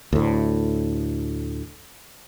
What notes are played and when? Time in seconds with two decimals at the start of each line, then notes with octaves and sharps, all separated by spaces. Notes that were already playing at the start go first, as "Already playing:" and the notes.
0.13 D2 A2